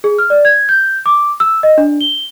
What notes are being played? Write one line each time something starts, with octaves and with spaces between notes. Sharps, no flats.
G#4
F6
D5
G#6
G6
D6
E6
D#5
D4
G7